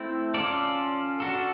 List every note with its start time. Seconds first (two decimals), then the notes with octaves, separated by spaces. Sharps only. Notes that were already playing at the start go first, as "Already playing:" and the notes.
Already playing: A3 C4 E4
0.34 C#4 F4 A4 D5
1.20 D4 F#4 A4